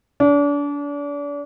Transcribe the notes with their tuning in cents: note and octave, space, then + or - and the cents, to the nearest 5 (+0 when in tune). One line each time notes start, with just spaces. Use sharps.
D4 -35